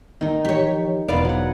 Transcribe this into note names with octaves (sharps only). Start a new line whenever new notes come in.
D#3 A#3 D#4
E3 F3 G4 C#5
E1 G#2 D3 B3 B4 D5 F5
F#3 F#5